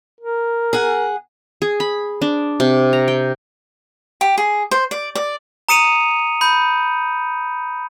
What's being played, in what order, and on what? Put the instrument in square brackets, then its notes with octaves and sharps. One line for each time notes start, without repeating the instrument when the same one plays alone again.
[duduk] A#4
[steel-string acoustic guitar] G#4 F#5
[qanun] G#4
B5
D4
C3
A#5
G5
[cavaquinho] G4
G#4
C5
D5
D5
[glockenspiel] A#5 D#6 C#7 D#7 F7
B5 G6